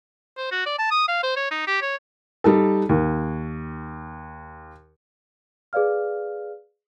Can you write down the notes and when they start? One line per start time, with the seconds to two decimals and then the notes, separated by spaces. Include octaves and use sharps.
0.37 C5
0.51 F#4
0.66 D5
0.79 A5
0.91 D#6
1.08 F5
1.23 C5
1.36 C#5
1.51 D#4
1.67 G4
1.82 C#5
2.44 G3 D#4 A4
2.89 D#2
5.73 G#4 B4 D5 F5 F6